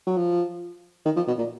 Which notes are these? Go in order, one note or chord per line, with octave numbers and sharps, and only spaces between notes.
F#3
F3
D#3
F3
B2
A#2